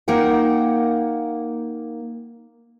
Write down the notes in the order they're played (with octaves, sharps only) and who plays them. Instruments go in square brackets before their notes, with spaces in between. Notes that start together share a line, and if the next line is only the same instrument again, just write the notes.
[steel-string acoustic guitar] A#3 D#4 A#4 F#5 G5